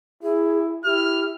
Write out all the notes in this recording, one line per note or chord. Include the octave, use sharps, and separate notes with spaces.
E4 G#4
E4 G4 F6